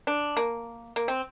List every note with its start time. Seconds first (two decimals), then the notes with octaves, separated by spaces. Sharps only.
0.07 D4
0.37 A#3
0.96 A#3
1.08 C4